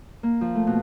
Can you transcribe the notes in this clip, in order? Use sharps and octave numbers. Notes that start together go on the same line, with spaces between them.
A#3
F3
A3
B2